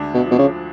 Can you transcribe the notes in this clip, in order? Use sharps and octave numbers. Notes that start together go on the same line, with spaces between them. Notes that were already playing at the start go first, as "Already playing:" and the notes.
Already playing: D2 G#3 D4
B2
B2 F3
C#3